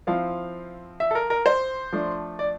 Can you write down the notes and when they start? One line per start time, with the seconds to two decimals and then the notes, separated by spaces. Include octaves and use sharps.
0.07 F3 C4 E4 F5
1.00 E5
1.11 A4
1.15 A#4
1.30 A#4
1.46 C5
1.92 F3 A3 D4
2.39 D5